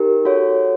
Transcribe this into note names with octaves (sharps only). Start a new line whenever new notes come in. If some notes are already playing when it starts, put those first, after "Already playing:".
Already playing: D#4 G4 A#4
F#4 A4 C#5 F#5